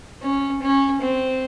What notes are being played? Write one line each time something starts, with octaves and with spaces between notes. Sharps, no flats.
C#4
C#4
C4